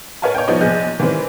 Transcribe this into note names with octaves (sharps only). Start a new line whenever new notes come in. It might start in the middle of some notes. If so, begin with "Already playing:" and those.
A#4 B4 C#5 F5 G#5 A5
C#5 G5
F3 G3 B3 D#4 C#5 D#5
A#1 E2 G#4 D#5 F#6 G6
D#3 E3 G3 C4 B4